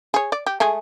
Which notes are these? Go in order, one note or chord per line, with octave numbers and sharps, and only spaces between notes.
G#4 C#5
D5
G4
G#3 A3 G#4